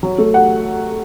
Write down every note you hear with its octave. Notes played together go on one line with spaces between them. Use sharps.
F#3
A3
F#5